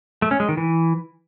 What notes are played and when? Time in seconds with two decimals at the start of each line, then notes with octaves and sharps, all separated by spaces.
0.22 A3
0.31 C#4
0.40 G#3
0.49 D#3
0.57 E3